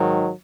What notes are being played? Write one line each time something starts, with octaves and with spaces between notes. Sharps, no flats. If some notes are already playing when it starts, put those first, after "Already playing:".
Already playing: G#2 D#3 F#3